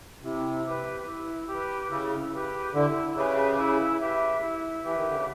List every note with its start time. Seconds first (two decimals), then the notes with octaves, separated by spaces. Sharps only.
0.22 C3 E4
0.65 G4 B4
1.06 E4
1.48 G4 B4
1.90 C#3 E4
2.32 G4 B4
2.73 D3 E4
3.15 C#3 G4 B4 E5
3.58 E4
3.99 G4 B4 E5
4.41 E4
4.82 E3 G4 B4 E5
4.96 D#3
5.06 D3
5.15 C#3